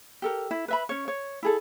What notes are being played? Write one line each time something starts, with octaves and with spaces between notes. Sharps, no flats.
G4 A4 A#4
E4
B4 E5 B5
C#4 C#5
C#5
E4 G#4 A4